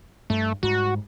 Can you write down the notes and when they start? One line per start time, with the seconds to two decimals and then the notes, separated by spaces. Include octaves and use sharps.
0.30 G2 A3
0.63 G#2 G3 F#4